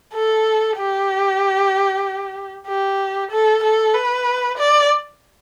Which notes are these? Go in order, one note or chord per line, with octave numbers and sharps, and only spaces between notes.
A4
G4
G4
A4
A4
B4
D5